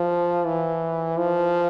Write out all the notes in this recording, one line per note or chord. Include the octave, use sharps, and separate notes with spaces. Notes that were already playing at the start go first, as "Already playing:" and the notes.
Already playing: F3
E3
F3